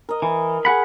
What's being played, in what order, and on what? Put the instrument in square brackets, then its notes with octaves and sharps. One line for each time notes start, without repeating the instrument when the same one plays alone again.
[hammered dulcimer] A#4 D#5
[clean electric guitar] E3
G#4 F#5 B5